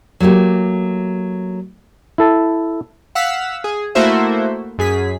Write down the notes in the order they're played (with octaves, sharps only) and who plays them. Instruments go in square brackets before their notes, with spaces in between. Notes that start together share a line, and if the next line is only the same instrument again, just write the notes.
[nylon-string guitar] F#3 A3 A#3 G4
[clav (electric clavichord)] E4 A4 A5
[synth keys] F5 F#5 E6 B6
G#4
A3 A#3 E4 F#4 C5 E5
F#2 G#4 B6